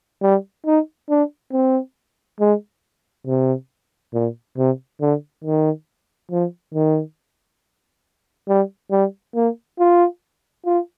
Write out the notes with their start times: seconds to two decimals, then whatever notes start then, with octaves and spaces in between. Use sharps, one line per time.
0.22 G3
0.66 D#4
1.10 D4
1.52 C4
2.40 G#3
3.27 C3
4.14 A#2
4.58 C3
5.01 D3
5.44 D#3
6.31 F3
6.74 D#3
8.49 G3
8.91 G3
9.35 A#3
9.79 F4
10.66 F4